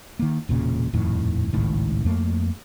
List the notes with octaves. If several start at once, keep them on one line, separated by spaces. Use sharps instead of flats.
D#3 A#3
E1 A#2 C#3
D#1 F2 A2 D#3
G#1 C#2 A2 D#3
F2 A3 A#3